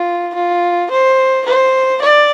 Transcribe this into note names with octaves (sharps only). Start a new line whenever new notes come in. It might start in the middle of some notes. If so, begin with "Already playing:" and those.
Already playing: F4
F4
C5
C5
D5